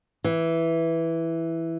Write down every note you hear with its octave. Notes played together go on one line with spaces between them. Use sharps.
E3